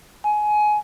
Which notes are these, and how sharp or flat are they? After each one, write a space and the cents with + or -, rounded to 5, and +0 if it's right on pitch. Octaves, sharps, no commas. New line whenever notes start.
G#5 +20